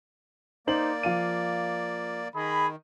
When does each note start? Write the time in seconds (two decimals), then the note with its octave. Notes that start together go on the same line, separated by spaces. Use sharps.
0.67 A#3 D#4 C5 D5 F#7
1.03 F3 F5 D#7
2.34 D#3 G#4 D#5 B5